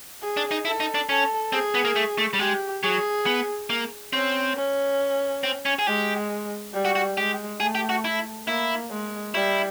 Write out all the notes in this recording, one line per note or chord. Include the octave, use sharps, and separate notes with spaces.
G#4
D4
D#4
E4 A4
D#4
D4
C#4 A4
C4 G#4
B3
A#3
A3
A3
G3
G#3 G4
F#3 G#4
B3
A#3
C4 C#4
C#4
C4
C#4
G#4
G#3 G4
G3
F#4
F#4
G#3 G4
A3 G#4
G4
F#4
E4
A#3 E4
G#3
G3 E4